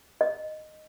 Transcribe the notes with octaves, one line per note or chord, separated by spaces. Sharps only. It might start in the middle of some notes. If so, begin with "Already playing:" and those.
D#5